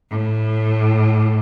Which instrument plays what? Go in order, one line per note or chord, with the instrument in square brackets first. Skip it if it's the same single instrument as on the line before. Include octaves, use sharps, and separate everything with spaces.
[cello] A2